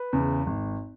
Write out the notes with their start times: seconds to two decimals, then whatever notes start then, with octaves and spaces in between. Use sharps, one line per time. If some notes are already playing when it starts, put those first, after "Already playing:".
Already playing: B4
0.13 E2 C#3
0.46 G#1